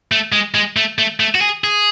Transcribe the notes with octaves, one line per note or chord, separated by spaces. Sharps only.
A3
G#3
G#3
A3
A3
A3
F#4
G#4
G#4